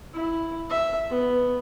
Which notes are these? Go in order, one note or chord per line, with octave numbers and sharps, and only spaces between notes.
E4
E5
B3